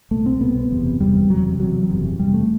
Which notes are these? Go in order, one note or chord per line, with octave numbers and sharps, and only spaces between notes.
C2 B2 A3
C4
C2 B2 B3
F#1 E2 C3
F#1 E2 C3 G3
E1 E2 C3 F#3
E1 E2 C3 F#3
F#1 E2 C3
F#1 E2 C3 G3
A3